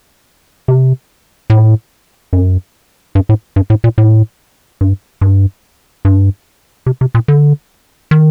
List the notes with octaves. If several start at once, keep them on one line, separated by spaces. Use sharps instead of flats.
C3
A2
F#2
G2
A2
G2
A2
A#2
A2
G2
G2
G2
C3
C3
A#2
D3
D#3